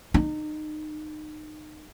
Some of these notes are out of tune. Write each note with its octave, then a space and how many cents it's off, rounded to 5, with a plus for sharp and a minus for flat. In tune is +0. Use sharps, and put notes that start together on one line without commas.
D#4 -30